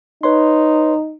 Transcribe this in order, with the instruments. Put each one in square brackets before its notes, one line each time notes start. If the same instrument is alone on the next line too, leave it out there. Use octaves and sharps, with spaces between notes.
[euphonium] D#4 [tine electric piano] B4 C#5 C6